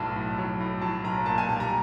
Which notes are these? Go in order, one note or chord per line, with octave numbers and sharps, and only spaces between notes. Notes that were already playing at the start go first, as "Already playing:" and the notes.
Already playing: B1 A2 F#3 A5
A2
F#3
A2
F#3 A5
B1 A#5
A#2 A5
G#5
G3 A5
A#5